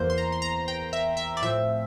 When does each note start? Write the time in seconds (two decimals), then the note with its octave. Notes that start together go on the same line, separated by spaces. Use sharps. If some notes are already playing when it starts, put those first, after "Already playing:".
Already playing: E2 E3 A#3 C5
0.10 C6
0.18 A#5
0.32 C6
0.42 A#5
0.68 G5
0.93 E5
1.17 E5
1.37 D5
1.42 A2 F3 C4 E5